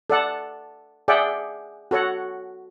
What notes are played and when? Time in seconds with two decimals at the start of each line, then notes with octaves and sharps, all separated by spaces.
0.10 A4 D5 F#5 A5
1.08 G#4 D5 E5 F#5 G5
1.91 F#4 A4 C#5 F#5